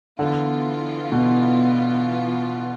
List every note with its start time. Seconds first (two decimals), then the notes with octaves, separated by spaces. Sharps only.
0.19 D3 E3 B3 F4
1.12 B2